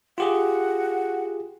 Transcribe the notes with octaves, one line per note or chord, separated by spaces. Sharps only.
F4 G4 G#4 F#5